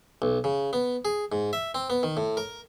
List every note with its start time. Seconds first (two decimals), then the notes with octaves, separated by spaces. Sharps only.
0.22 B1
0.44 C#3
0.73 B3
1.05 G#4
1.32 G#2
1.53 E5
1.75 C4
1.90 B3
2.03 D#3
2.17 A2
2.37 A#4